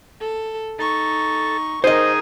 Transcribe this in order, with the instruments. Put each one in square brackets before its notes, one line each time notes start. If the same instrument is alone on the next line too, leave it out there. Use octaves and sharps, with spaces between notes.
[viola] A4
[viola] D#4 C#6 [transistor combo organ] A4
[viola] D#3 A#4 [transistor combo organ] D#4 G#4 D#6 [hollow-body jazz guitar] C5 D#5